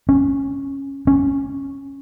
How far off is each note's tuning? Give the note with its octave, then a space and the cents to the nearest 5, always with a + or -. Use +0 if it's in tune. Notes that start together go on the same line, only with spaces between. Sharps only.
C#4 -10
C#4 -5